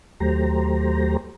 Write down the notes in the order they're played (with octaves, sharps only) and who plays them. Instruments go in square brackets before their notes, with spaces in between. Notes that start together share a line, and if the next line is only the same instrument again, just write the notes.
[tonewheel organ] D#2 F#3 A3 G4 C5 A#5